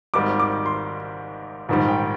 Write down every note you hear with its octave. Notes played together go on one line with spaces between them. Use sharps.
G#1 G#2 D#3 G3 D6
D6
C6
A#1 G#2 D#3 G3
G5